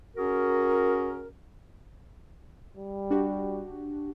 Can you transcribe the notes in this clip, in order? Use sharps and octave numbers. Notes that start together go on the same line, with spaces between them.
C#4 F#4 G#4 A#4
G3
D4 F#4 G4